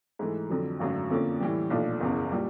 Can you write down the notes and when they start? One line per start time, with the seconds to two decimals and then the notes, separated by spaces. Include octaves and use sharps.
0.19 G#2 E3 A3
0.49 F2 D3 F#3
0.80 G#1 F#2 D3 F#3 A3
1.10 F2 D3 F3 A#3 C#4
1.40 A2 E3 G3
1.70 B1 A#2 F3 A3 D4
2.01 F#1 E2 C#3
2.32 A#2 G3